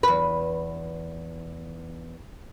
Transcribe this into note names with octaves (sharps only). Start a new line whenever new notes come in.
E2 B4